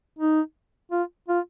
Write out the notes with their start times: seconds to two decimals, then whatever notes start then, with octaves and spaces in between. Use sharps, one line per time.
0.19 D#4
0.91 F4
1.29 F4